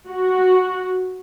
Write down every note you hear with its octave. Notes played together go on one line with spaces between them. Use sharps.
F#4